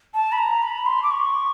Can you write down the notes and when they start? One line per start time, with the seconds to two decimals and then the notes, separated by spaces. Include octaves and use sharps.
0.14 A5
0.32 B5
0.38 A#5
0.63 B5
0.86 C6
1.03 D6
1.11 C#6